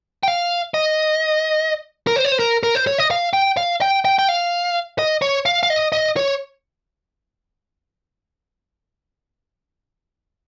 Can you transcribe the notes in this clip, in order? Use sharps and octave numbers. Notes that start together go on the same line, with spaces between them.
G5
F5
D#5
A#4
C5
C#5
C5
A#4
A#4
C5
C#5
D#5
F5
G5
F5
G5
G5
G5
F5
D#5
C#5
F5
F5
D#5
D#5
C#5